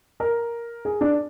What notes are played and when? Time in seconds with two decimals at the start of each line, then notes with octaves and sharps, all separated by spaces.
0.20 A#4
0.85 G#4
1.01 D4